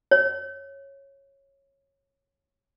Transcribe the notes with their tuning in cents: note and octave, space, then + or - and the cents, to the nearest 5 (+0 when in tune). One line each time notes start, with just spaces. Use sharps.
C#5 -10